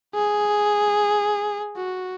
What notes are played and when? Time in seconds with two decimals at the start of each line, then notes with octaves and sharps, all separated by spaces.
0.15 G#4
1.76 F#4